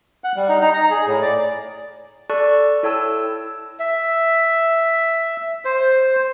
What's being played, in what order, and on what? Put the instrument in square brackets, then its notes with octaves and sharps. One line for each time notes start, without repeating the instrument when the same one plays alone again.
[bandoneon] F#5
G3
D#4
D#4
A#5
G#4
A2
D5
[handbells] A4 D5 A5 C#6 F#6
E4 A4 C#5 G5 A5 E6
[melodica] E5
C5